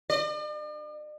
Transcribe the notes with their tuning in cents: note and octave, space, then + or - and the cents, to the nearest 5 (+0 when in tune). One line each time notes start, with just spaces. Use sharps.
D5 +45